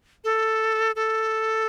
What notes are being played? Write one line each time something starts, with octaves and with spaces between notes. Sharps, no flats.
A4
A4